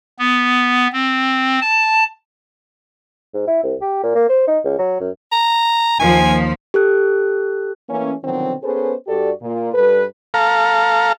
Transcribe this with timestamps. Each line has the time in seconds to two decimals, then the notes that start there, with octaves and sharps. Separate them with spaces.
0.18 B3
0.93 C4
1.61 A5
3.34 G#2
3.47 E4
3.63 C2
3.81 G4
4.03 A#2
4.15 A#3
4.29 C5
4.47 D#4
4.64 C#2
4.78 F#3
5.00 F#2
5.32 A#5
6.00 D#2 F3 G#5
6.74 G4 A4 F#6
7.89 E3 A3 A#3 C#4
8.23 B2 D3 D#3 F3 F#3 C4
8.63 B3 C#4 G#4 A4 B4 C5
9.07 G2 F#4 G4 A4 D5
9.42 A#2
9.74 G2 G3 A4 B4
10.34 A4 F5 A#5